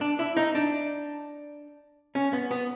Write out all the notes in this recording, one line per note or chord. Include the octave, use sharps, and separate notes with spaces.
D4
E4
D#4
D4
C#4
B3
B3